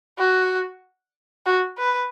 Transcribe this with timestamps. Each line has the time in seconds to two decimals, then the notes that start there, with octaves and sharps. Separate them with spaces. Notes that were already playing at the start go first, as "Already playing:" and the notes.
0.19 F#4
1.46 F#4
1.78 B4